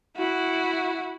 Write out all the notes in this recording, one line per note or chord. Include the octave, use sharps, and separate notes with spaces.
E4 F#4